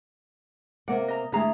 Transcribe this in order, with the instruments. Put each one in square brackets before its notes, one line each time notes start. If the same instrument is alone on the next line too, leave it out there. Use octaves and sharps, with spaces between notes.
[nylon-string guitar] C3 A#3 D5 [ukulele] F#5
[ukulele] D#5 A#5
[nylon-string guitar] D3 A3 [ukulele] E4 G#4 A#5